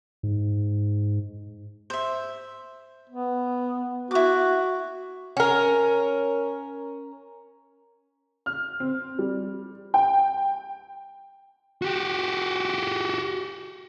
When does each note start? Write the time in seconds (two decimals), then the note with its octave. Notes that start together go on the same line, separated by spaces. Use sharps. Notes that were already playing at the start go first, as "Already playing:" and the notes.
0.23 G#2
1.90 C5 E5
3.09 B3
4.11 E4 F#4 D6
5.37 C#4 A#4
8.46 F6
8.80 C4
9.19 G3
9.94 G5
11.82 F#4 G4